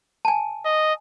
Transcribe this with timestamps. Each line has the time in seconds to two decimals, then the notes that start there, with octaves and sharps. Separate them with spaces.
0.25 G#5 A5
0.65 D#5